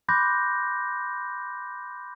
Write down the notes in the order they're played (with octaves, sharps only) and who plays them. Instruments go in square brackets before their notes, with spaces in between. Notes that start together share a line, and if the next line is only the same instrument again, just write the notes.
[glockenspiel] B5 C6 D6 F#6 G6 A#6